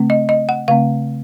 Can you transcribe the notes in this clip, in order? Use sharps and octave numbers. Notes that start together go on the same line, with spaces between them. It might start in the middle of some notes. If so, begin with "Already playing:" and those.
Already playing: C#3 A3 C4
D#5
D#5
F#5
C#3 A3 C4 F5